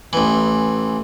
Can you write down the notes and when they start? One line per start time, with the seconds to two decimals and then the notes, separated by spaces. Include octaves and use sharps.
0.13 A1 E3